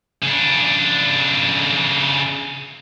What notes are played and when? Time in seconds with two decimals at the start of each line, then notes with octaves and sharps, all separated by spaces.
0.22 C#3 D4